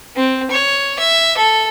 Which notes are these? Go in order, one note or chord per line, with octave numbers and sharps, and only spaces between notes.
C4
C#5
E5
A4